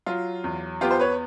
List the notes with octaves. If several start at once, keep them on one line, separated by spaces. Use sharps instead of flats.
F#3 F4
E2
B3 F4 G4
C5
B4 C#5